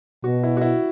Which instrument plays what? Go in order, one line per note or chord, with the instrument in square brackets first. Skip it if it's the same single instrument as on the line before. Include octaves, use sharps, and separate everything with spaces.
[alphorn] B2 [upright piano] F#4
[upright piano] E4
F#4
E4